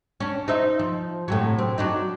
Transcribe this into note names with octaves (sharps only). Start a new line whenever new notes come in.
C#4 D4
D#4 C5 E5
F3
A2 C3 F#3
C4
F#3 D4 D#4